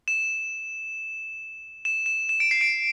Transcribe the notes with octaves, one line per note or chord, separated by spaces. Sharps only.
E7
E7
E7
E7
D7
C7
D7